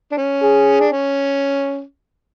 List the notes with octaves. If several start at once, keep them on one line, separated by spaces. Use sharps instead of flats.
D4
C#4
G#4
D4
C#4